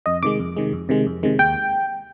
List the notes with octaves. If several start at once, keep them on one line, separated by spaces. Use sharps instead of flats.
F2 D#5
C3 D#3 G#3 D6
F2
C3 D#3 G#3
F2
C3 D#3 G#3
F2
C3 D#3 G#3
D#2 G5